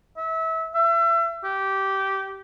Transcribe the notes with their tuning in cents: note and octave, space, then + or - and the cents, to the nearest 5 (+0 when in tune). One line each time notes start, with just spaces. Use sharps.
E5 -25
E5 +35
G4 -15